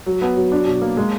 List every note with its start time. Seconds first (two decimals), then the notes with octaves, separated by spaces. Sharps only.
0.06 F#3
0.22 B3
0.37 F#3
0.52 D4
0.67 B2
0.82 A#3
0.97 G#3